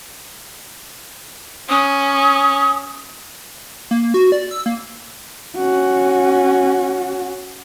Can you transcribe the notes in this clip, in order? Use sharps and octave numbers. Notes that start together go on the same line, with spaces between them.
C#4 D#6
A#3
F#4
D5
E6
A#3
C#4 F#4